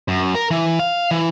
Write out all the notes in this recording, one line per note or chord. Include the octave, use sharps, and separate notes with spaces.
F#2
A#4
E3
F5
E3